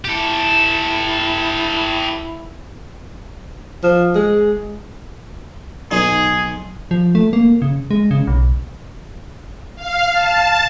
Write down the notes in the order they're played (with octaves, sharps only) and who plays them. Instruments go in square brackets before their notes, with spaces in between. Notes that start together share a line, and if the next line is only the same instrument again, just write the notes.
[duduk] E4 [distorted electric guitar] G4 A4
[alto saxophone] F3
G#3
[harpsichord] B1 D#4 [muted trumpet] G#4
[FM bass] F3
A3
A#3
C#3
G#3
C#3
B1
[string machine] F5
A5